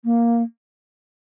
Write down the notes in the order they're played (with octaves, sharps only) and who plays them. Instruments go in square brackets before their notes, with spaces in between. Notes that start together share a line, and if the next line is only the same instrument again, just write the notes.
[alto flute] A#3